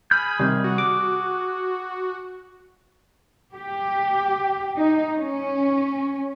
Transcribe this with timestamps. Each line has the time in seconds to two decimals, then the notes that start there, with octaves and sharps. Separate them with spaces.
0.11 G#4 B5 F6 G6
0.40 C3 D#3 G3
0.64 F#4
0.78 D6
3.55 G4
4.78 D#4
5.18 C#4